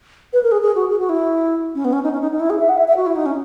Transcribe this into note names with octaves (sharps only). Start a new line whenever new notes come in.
B4
A#4
G#4
G#4
F#4
G#4
F#4
E4
C#4
B3
C#4
D#4
C#4
D#4
D#4
E4
G#4
E5
F#5
E5
E5
F#4
E4
D#4
C#4